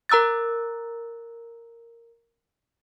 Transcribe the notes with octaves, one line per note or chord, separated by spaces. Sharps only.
A#4 A#5 E6 F#6 A6